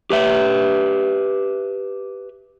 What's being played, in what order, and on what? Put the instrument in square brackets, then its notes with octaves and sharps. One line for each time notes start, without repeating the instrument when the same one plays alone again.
[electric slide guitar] G4 B4 E5